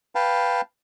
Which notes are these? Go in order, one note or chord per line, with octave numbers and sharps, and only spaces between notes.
B4 F5 G5 A5